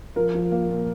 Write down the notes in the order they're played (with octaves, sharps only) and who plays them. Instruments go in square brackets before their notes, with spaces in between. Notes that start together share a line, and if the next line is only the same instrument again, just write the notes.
[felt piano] F3 [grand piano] A#4
[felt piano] F3
A#3
A#2